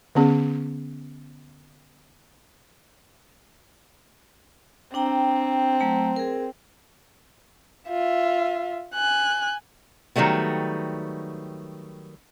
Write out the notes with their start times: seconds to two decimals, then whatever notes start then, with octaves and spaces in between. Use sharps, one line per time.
0.15 D3 B3 C#4 G#4
4.94 C4 D4 G5 A#5
5.80 F#3 A3 A#5
6.16 G#4 A#4
7.88 F4 E5
8.95 G#5 F#6
10.16 D#3 F#3 G3 A3 B3